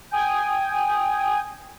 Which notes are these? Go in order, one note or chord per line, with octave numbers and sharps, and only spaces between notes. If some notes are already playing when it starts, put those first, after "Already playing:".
G5 G#5 D#6